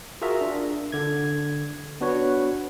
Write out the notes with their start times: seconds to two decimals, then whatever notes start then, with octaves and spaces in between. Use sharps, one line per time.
0.22 F4 F#4 G#4 A#4 E5 A#5
0.41 D4
0.92 D3 G#6
2.01 B3 D4 F#4 B4 C#5